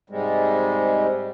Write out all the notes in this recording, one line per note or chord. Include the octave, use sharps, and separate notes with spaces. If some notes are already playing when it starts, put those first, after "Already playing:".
G#2 C3 G3 G#3